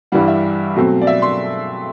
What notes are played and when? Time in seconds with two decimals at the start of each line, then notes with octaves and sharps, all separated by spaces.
0.12 G2 E3 G3 F#5
0.28 E5
0.76 B2 F#3 A3 C4
1.02 D5
1.07 E5
1.22 C6